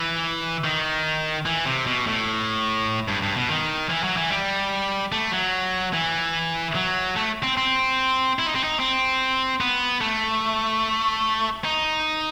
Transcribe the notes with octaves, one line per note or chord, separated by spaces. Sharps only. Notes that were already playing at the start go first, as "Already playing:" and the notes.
Already playing: E3
D#3
E3
C3
B2
A2
G2
G2
B2
D#3
E3
F#3
E3
G3
A3
F#3
E3
F#3
A3
C4
C4
E4
D#4
C4
D#4
C4
B3
A3
D#4